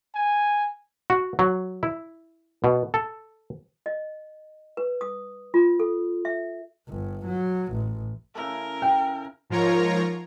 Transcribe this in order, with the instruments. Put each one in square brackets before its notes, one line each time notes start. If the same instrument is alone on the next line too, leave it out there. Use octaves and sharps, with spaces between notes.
[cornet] G#5
[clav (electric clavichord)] F#4
F#3
E4
B2
A4
[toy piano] D#5
B4
D#6
F4
A4
E5
[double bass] G1
F#3
A1
[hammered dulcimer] C#3 E4 A4 [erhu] A#4
[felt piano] G5
[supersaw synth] G#2 F3 F4 A#4 C#5 A#5